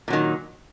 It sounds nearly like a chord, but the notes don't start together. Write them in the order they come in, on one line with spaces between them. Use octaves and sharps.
A#2 F#3 D#3